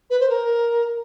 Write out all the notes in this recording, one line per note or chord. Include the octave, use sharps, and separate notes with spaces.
B4
C5
A#4